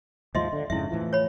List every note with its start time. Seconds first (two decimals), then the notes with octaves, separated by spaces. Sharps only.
0.35 D#2 G#2 F3 D#5 E5 C6
0.53 D3
0.70 F2 G#2 C#3 E4 E5
0.91 A2 E3 F3
1.13 C#5 B5